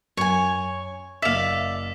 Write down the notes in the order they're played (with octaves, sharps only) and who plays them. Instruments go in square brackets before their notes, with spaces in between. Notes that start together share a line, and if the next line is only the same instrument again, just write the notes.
[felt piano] F#2 [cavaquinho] C#5 G#5
[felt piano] F#1 E5 [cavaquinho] D5 F5 [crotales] E6 B6 E7